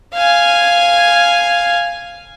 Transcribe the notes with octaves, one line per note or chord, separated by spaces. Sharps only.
F5 G#5